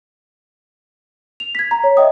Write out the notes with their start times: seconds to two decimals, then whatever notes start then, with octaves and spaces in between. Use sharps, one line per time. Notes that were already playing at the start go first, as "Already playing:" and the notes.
1.40 F7
1.55 G#6 B6
1.71 A#5
1.84 C#5
1.97 D#5 E5 G5 D#6